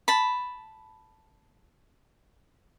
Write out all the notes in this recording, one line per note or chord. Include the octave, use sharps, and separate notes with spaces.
A5 B5